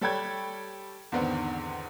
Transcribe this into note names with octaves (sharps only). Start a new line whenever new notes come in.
G3 A4 C#5 G5 B5 G#6
E2 G#2 D3 D#3 B3 C4